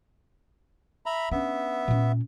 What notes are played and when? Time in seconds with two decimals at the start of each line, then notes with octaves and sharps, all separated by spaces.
1.06 E5 A#5 B5
1.32 B3 C#4 D4 E5
1.88 A#2 C#4